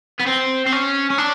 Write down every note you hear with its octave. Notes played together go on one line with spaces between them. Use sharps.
B3
C4
C4
C#4
C#4
D4